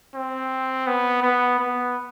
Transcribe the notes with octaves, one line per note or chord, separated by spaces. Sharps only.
C4
B3
B3
B3